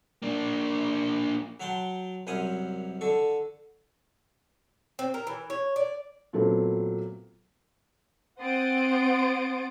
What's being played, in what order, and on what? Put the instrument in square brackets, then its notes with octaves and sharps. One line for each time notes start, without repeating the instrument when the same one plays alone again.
[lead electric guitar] A#3 D4
[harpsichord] F#3 F#4 F#5 G5 A5 C6
C2 F#2 C#4 C5 F#5 D#6
D3 A4 C#6
[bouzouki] C4
A#4
E3
C#5
D5
[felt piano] A#2 F#3 A3 B3 C4
[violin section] C4 F#5 C6 D#6 A6 D7